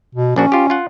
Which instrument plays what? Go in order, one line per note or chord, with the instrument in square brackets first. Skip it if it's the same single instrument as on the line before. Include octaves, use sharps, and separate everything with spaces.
[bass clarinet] B2
[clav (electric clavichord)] A#1 D4 F#4 [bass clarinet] C#4
[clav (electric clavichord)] F4 G4
F4 F#5